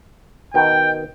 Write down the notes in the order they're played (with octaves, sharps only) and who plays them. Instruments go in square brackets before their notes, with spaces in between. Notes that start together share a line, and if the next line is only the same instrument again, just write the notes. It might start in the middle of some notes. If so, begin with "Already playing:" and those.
[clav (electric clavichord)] B2 D#3 [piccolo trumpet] G5